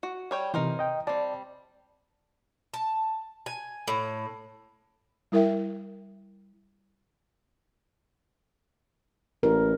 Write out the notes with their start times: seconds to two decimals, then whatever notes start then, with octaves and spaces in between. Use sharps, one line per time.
0.03 F#4
0.31 G3 C#5 G5
0.54 C3 E3 D#4 A#4 C5
0.79 D#5 G5
1.07 G3 C4 D5 A5
2.74 A5
3.46 G#5
3.88 A2
5.32 G3 E4 A#4 E5 G5
9.43 A1 A#4